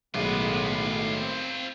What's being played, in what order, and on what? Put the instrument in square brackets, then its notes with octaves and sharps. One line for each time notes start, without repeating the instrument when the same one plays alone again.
[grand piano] B1 [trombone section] A2 D#3 A3 [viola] G#3 B3 [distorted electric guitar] F4 B4
[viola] C4